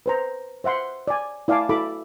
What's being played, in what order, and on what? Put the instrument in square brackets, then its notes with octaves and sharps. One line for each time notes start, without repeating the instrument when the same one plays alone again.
[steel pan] B4 C5 A#5
C5 E5 F#5 C6
D5 G#5
E4 D5 F5 G#5 A5 D6
E4 F#4 A4 B5 D6